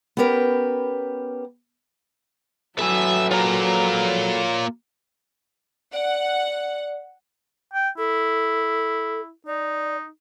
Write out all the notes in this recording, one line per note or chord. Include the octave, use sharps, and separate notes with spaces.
B3 C#4 G4 A#4 B4
F#3 A4 B4 E5 G#5
A#3 F4 C#5 A#5
D5 F#5
G5
E4 A4
D#4 D5